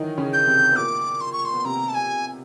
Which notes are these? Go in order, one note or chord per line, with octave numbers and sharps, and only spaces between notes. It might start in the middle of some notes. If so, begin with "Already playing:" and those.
Already playing: D#3 E3 F#3 D#4
C#3 C#4
G6
C3 C4
B3
A#2 A#3 D6
C6
C#6
C6
B3
C3 C4 A#5
A5
G#5